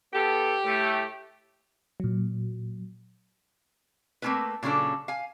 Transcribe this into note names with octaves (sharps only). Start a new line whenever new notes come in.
B3 G4 A4
A2 A3
A#2 F#3
A3 A#3 C4 C#4 E4 B4
A#2 C#3 F#3 C#4 D4 A4
F5 G#5